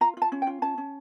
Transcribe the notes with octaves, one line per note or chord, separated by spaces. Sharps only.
F4 A#5
F4 A5
C#4
G5
F4
C#4 A5
C#4